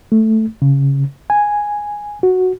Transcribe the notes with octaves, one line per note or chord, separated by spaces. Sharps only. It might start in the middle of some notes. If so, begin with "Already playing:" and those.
A3
C#3
G#5
F#4